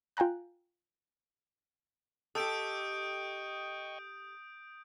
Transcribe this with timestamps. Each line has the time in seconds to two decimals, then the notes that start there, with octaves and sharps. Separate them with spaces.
0.17 F4 G5 G#5 A#5 F#6
2.35 G4 A4 D#5 G5 C#6 D#6 G6 D7